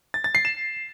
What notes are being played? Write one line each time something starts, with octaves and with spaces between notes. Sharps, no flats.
A6
A6
C7
E7